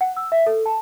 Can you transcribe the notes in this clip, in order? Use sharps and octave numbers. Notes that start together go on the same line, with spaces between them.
F#5
E6
E5
A4
A5